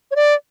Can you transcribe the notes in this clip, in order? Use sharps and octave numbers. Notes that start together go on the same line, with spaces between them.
C#5
D5